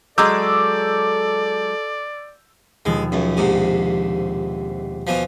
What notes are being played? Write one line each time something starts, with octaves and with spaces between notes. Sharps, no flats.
F#3 G#3 A4 D5 D6 E6 G6
D#2 B2 F3 G#3
C#2 F#2
A#1 G#2 C3
B2 E3 F3